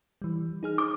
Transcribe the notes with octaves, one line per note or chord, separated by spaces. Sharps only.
E3 G3
D#4 G#4 F6
D6